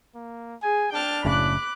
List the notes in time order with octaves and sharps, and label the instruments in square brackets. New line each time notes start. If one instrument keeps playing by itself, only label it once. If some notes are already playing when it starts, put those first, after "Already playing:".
[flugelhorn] A#3
[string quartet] G#4 [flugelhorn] G#5
[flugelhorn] D4 [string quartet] G5 A5 F6
[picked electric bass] F#1 A2 C#3 [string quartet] B5 D6 F#6